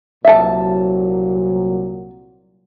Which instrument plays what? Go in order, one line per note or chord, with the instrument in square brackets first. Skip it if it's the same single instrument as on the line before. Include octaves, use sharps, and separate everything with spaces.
[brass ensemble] C2 A#2 F#3 [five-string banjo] E5 A5